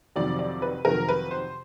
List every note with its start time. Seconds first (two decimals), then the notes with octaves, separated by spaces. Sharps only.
0.16 F2 C3 D#3 F#3 D5
0.39 D5
0.62 B4
0.85 F2 C3 D#3 F#3 A#4
1.09 B4
1.31 C5